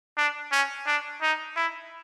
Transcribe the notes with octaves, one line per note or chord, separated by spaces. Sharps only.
D4
C#4
D4
D#4
E4